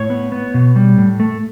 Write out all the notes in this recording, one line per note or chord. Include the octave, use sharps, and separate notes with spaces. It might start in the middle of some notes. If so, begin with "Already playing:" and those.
Already playing: A2 C#5
B3
B3
B2
G3
A2
A3